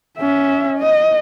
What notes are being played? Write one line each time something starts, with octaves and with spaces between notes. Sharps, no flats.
C#4 E5
D#5